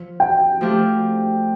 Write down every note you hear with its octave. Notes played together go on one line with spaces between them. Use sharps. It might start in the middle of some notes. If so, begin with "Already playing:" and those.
Already playing: F3
G5
F3 A3 D4 G4 F5